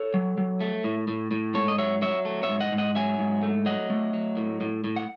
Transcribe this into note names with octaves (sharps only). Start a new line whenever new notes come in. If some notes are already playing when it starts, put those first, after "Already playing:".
Already playing: A4 C#5
F#3
F#3
A3
A2
A2
A2
G#2 A4 C#5
D#5
F#3 C#5 E5
F#3 C#5 E5
A3
C#5 E5
G#2
D#5 F#5
G#2
D#5 F#5
F#3 E5 G#5
G#2
A3
F#3 D#5 F#5
A3
F#3
A2
A2
A2
F#5